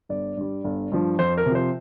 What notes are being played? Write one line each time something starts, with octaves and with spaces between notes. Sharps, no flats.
G1 D5
G2 G3
G1
G2 F3
F2 C5
A#4
C3
F3 C5